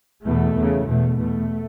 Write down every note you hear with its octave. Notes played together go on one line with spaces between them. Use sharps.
E2 B2 A3
E2
C#3
E2 B2 A3
E2 B2 A3